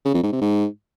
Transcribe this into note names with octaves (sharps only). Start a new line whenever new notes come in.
C#3
F2
G#2
C3
G#2